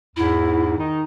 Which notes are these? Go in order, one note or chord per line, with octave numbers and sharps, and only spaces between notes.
E2 G#2 E4
D#3 D#4